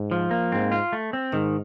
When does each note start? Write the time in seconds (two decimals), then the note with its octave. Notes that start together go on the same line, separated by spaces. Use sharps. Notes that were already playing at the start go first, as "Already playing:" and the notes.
Already playing: G#2
0.11 F3
0.31 A#3
0.52 G#2 C4
0.72 F4
0.93 A3
1.13 C4
1.33 G#2 D#3